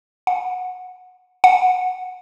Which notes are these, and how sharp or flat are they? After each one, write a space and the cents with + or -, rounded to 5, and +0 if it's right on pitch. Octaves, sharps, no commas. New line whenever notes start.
F#5 -15
F#5 -10